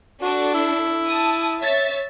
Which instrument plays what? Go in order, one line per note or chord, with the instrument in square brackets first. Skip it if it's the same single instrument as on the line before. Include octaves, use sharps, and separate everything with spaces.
[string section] D4 A4 [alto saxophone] F#4
[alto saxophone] E4
[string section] A5 D#6
C#5 E5 A6